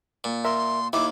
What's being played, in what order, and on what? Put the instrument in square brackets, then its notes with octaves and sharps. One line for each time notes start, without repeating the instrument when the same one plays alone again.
[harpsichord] A#2
[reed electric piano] A#4 E5 [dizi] C6
[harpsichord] D#2 D#3 [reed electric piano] E4 [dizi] D6